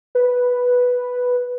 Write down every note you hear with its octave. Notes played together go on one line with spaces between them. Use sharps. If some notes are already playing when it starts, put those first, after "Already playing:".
B4